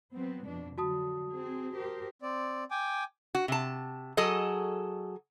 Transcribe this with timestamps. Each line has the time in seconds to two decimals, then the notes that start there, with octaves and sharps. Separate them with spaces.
0.14 F#3 B3 C4
0.45 F2 B2 D4
0.78 D3 F#3 F#4 A5 D#6
1.30 C4 G#4
1.75 G4 A#4 C5
2.22 C4 D5
2.71 G5 G#5 D6
3.35 F#4
3.48 C3 A5
4.17 F#3 G#4 A4 D#5